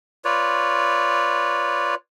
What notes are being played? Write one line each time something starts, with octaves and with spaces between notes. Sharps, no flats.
F4 B4 C#5 D5